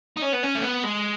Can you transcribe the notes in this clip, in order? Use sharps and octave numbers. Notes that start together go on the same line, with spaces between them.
D#4
C#4
B3
C#4
A3
B3
G#3